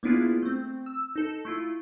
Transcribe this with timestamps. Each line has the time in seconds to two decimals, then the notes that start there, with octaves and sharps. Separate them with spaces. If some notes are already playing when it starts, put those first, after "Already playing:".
0.03 A#3 B3 D4 E4 F4 G#4
0.43 A3 C4
0.86 E6
1.16 D#4 A4
1.45 A3 E4 F4